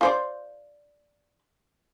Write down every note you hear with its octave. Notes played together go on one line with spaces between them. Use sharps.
F4 C5 D5